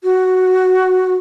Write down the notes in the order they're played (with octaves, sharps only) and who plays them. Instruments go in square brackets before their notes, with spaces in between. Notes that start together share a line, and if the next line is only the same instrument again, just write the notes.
[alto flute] F#4